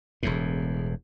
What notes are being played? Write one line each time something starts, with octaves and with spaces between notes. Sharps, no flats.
E1 E2 A2